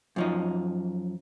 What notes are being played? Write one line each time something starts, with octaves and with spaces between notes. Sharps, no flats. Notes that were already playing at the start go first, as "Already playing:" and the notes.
F#2 F3 D#4